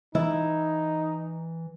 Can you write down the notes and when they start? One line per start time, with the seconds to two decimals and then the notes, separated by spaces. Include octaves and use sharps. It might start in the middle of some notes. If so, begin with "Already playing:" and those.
0.15 E3 D#4 E4